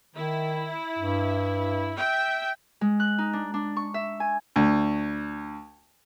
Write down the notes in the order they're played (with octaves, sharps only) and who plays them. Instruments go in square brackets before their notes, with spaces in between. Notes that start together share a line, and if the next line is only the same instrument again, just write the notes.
[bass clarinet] D#3 [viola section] E4
[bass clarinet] G2
[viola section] E5 G5
[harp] G#3
F#6
D#4
D4
D4
C#6
E5
G#5
[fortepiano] D2